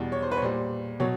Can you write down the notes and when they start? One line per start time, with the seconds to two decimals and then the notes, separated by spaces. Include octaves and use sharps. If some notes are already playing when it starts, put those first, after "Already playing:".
Already playing: E2 B2 G3
0.12 C#5
0.22 C5
0.32 B4
0.37 C#5
0.42 A#2 G3 C5
1.00 B2 F#3 C#5